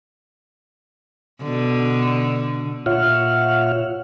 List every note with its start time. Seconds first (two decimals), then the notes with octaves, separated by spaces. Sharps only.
1.42 B2 D3
2.86 A#2 F4 C#5 E5 F#5 F6